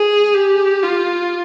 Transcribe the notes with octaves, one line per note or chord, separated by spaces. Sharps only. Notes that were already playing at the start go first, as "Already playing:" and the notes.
Already playing: G#4
G4
F4